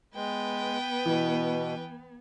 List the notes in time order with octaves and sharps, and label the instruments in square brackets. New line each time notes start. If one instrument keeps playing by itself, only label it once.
[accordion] G#3 [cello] B3 [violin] B4 G5
[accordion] B2 [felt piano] E3